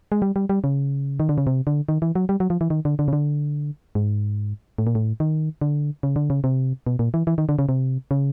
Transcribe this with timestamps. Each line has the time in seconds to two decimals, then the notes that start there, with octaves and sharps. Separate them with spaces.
0.12 G#3
0.22 G3
0.36 G3
0.49 G3
0.64 C#3
1.20 D#3
1.29 D3
1.38 C#3
1.47 C3
1.67 D3
1.89 D#3
2.02 E3
2.15 F#3
2.29 G3
2.40 F#3
2.50 F3
2.61 E3
2.70 D#3
2.85 D3
2.99 D3
3.08 C#3
3.13 D3
3.95 G#2
4.78 A2
4.87 A#2
4.95 A2
5.20 D#3
5.61 D3
6.03 C#3
6.16 D3
6.30 C#3
6.44 C3
6.87 B2
6.99 A#2
7.14 E3
7.27 E3
7.38 D#3
7.49 D3
7.59 C#3
7.69 C3
8.11 C#3